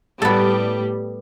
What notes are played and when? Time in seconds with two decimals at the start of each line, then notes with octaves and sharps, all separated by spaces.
0.22 A2 G3 B3 A4